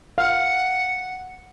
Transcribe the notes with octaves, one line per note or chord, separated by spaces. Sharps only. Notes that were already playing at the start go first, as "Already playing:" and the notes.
F5 F#5